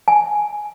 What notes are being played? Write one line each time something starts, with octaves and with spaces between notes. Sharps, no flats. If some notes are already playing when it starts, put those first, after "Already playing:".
G#5